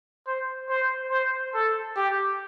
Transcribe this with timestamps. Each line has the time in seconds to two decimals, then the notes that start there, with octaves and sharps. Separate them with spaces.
0.27 C5
0.69 C5
1.11 C5
1.54 A4
1.96 G4